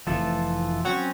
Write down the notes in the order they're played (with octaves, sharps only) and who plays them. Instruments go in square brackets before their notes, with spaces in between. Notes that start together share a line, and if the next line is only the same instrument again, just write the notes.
[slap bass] F1 F3 [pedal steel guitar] E3 F4 A4
[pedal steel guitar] F#3 C4 C#4 [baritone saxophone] F#4